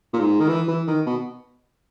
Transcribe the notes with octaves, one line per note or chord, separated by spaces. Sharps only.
A#2
G#2
D#3
E3
E3
D#3
B2